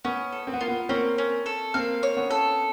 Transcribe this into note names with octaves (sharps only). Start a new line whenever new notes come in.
B3 C#4
A4
C4
B3
A#3 F4
B3
A#3 C4 C#4
C#4
A4
A#3 C4 F5
C#5
B3 C#4
A4